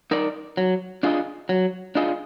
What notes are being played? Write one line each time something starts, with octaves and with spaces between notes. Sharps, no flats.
D#4 A#4 D5
F#3
D4 F4 G#4 D#5
F#3
D4 F4 G#4 D#5